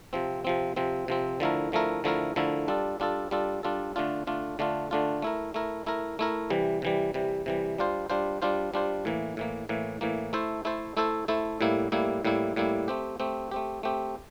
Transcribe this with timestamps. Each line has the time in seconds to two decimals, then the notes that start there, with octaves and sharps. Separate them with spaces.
0.13 C3 F3 C4
0.44 C3 F3 C4
0.76 C3 F3 C4
1.08 C3 F3 C4
1.40 D3 F3 A3 E4 A#4
1.72 D3 F3 A3 E4 A#4
2.04 D3 F3 A3 E4 A#4
2.36 D3 F3 A3 E4 A#4
2.68 G3 D4 F4 A4
3.00 G3 D4 F4 A4
3.31 G3 D4 F4 A4
3.63 G3 D4 F4 A4
3.96 D3 A3 D4 F4
4.27 D3 A3 D4 F4
4.59 D3 A3 D4 F4
4.91 D3 A3 D4 F4
5.22 A3 E4 A#4
5.54 A3 E4 A#4
5.86 A3 E4 A#4
6.19 A3 E4 A#4
6.50 C3 E3 G3
6.82 C3 E3 G3
7.14 C3 E3 G3
7.46 C3 E3 G3
7.78 G3 D4 F4 C5
8.10 G3 D4 F4 C5
8.42 G3 D4 F4 C5
8.74 G3 D4 F4 C5
9.05 A2 E3 A#3
9.37 A2 E3 A#3
9.69 A2 E3 A#3
10.01 A2 E3 A#3
10.33 A3 E4 A4 C5
10.65 A3 E4 A4 C5
10.97 A3 E4 A4 C5
11.28 A3 E4 A4 C5
11.61 A2 G3 A#3 E4
11.92 A2 G3 A#3 E4
12.25 A2 G3 A#3 E4
12.56 A2 G3 A#3 E4
12.88 A3 C4 G4
13.20 A3 C4 G4
13.51 A3 C4 G4
13.83 A3 C4 G4